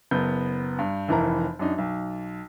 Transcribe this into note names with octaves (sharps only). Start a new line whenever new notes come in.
F#1 B3 G6
G2
F1 F2 E3 E4 A#4 A#5
F#2 D4 D#4
B1